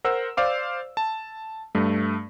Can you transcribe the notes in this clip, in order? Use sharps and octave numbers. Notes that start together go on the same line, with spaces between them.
A#4 C5 F#5 E6
C5 D5 F5 D6
A5
G2 A3